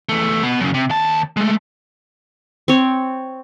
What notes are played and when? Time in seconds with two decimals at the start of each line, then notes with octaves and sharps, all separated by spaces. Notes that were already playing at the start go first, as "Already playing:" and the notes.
0.09 E2 A3
0.43 B2 B3
0.60 F#2 C#3
0.74 C3
0.90 D#2 A5
1.37 G#3 A3
2.68 C4 C#5